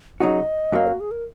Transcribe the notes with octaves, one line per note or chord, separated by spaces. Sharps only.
C#3 F#3 D#4 F#4 D#5
F#2 F#3 A#3
F#4
G#4
A#4